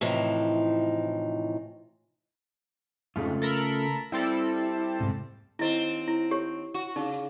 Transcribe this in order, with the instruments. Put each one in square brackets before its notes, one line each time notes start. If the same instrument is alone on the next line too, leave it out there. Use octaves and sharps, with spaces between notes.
[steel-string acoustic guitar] A2 C3 E3 F3 D#4
[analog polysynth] F2 G#2 [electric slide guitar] C#3 A3 F4
[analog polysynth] A4 A#4 B5
[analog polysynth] G3 C4 A4 [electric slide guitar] E4
[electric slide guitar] G#2 C3
[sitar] D#2 C4 [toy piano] E4 D#5
[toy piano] E4
G4 C#5
[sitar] F#4
[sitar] C#3 [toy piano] D#4